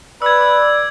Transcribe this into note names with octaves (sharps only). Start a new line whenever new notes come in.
B4 D5 E6 G#6